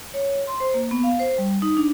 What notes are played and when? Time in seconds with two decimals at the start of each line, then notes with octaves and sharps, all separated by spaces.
0.14 C#5
0.47 C6
0.60 C5
0.74 A#3
0.91 B3
1.03 F5
1.19 C5
1.38 G3
1.62 D#4
1.77 D4